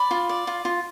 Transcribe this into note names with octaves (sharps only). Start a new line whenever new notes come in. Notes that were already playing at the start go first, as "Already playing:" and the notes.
Already playing: D5 B5
F4
D5
F4
F4